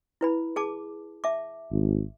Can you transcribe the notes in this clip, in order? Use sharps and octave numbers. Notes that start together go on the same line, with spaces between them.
E4 B4 B5
G#4 A5 D6
E5 A5 D6
G#1